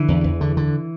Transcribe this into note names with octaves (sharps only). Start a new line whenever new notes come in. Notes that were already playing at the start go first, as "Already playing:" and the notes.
Already playing: D3 E3
E2
E2
D3
D3